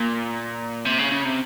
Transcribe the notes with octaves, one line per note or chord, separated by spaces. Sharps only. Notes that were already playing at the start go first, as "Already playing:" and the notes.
Already playing: A#2
C3
C#3
C#3
C3